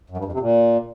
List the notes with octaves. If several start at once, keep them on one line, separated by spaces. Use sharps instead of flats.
F#2
G2
F2
C3
A#2